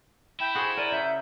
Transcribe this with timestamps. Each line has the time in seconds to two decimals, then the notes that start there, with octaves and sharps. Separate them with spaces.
0.40 E4 G5 B5
0.55 F#4 G#4 C5
0.77 A#4 D5 D#7
0.92 C#3 E5 G6